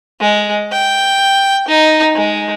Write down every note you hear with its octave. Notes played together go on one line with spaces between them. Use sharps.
G#3
G5
D#4
G#3